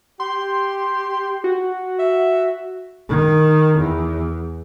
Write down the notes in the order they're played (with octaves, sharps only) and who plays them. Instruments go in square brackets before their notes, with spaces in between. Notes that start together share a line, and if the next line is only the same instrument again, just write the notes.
[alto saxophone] G4 [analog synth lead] C6
[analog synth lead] F#4
[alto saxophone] E5
[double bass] D#3
E2